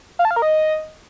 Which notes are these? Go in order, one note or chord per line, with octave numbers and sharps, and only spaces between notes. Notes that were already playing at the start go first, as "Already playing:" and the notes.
F5
A5
F5
A#4
D#5